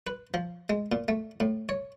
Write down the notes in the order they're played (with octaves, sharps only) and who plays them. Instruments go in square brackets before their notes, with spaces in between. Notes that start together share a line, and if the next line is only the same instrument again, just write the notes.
[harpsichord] B4
F3
G#3
A#2
A3
A2
C#5